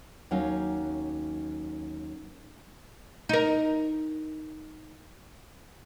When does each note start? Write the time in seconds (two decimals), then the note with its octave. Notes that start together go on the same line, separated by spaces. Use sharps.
0.31 D#2 F#3 C#4 D#4 F5
3.29 D#4 A#4